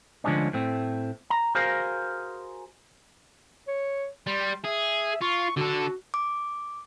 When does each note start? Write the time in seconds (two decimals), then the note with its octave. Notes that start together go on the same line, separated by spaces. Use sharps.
0.24 D2 D3 F3 G#3 C#4 D4
0.53 A2 A3 C4
1.30 A#5
1.55 F#4 G#4 A#4 C5 F5
3.68 C#5
4.27 G3 C6
4.65 G#4 E5
5.22 F4 C#6
5.57 D3 F#4 A4
6.14 D6